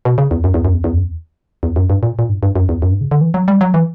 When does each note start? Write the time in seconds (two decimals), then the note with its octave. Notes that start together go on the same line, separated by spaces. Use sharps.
0.05 B2
0.18 C#3
0.31 E2
0.44 F#2
0.54 E2
0.65 F#2
0.74 E2
0.84 E2
0.94 F#2
1.03 E2
1.63 E2
1.76 F#2
1.90 G2
2.03 A#2
2.19 A#2
2.29 G2
2.43 G2
2.56 F#2
2.69 E2
2.82 F#2
2.91 G2
3.01 C#3
3.11 D3
3.21 E3
3.34 F#3
3.48 G3
3.61 F#3
3.74 E3